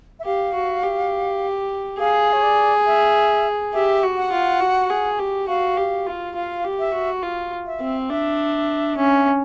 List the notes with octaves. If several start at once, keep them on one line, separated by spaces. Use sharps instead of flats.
E5
G4 F5
F#4
G4
G#4 F5
C#5
D5
E5
G4 E5
F#4
F#5
F4
F#4
G#4
G4
F#4 F5
G4
F4
F4 F5
G4
E5
F#4
F4
E5
C4
D4 E5
C#4